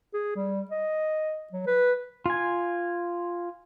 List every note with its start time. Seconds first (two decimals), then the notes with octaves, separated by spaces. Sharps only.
0.14 G#4
0.36 G3
0.70 D#5
1.53 F#3
1.67 B4
2.26 F4 G#5